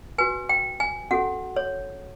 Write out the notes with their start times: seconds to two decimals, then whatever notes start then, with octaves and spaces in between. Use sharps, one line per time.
0.18 F#4 B4 G#5
0.49 G5
0.80 G#5
1.11 C#4 F#4 A4 F#5
1.56 C#5